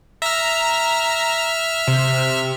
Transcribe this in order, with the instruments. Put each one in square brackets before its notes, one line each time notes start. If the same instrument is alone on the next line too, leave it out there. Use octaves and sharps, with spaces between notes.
[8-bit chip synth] E5 F6 [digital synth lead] A#5
[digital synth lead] C3